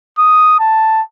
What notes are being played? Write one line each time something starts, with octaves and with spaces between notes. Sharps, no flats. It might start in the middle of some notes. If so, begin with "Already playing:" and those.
D#6
A5